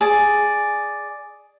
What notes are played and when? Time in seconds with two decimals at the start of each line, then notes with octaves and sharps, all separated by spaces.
0.01 G#4 D5